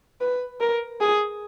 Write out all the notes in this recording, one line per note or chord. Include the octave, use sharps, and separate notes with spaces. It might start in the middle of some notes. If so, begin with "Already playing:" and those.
B4
A#4
G#4